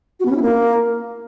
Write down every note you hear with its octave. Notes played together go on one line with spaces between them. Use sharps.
F#4
B3
C#4
E4
A#3